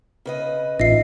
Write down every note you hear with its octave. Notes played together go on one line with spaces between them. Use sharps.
C#3 B4 D#5
A1 D#4 F4 D#5 E5 C7